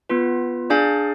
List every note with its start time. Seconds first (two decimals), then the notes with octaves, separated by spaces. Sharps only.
0.09 B3 F4 B4
0.70 D4 G#4 D5 F5 G#5